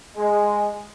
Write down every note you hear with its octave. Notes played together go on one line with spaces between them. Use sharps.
G#3